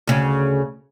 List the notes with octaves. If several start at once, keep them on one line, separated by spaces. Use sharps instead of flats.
D2 C#3